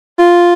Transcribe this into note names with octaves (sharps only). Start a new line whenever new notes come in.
F4